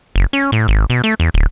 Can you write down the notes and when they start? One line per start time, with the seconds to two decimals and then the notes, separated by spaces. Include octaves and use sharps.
0.16 F#1
0.33 C#4
0.52 A2
0.68 G#1
0.90 B2
1.04 A3
1.20 E2
1.34 D1